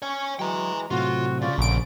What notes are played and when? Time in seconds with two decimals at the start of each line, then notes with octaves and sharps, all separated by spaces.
0.02 C#5 G#5 C#6
0.39 E3 F#3 G#3 G5 A#5
0.91 A2 C3 F#3 F4 F#4
1.42 C#3 F4 D5
1.58 A#1 A#2 D3 D7